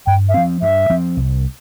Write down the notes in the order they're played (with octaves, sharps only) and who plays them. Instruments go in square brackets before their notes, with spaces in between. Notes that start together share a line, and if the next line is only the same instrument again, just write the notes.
[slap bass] G2 [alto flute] G5
[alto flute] E5
[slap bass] F3 C4 [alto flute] F5
[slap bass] G2 [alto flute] E5
[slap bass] F3 C4
C2